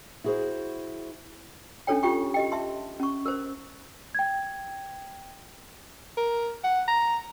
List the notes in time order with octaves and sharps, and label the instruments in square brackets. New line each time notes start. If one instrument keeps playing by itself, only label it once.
[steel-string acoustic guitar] E4 F#4 G#4 B4 C5
[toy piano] C#4 D4 A4 C#5 G5
F4 G4 G5 C#6
G4 D#5 G5
E5 A5 C6
C#4 C#6
A#4 C5
[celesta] G5 G#6
[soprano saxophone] A#4
F#5
A#5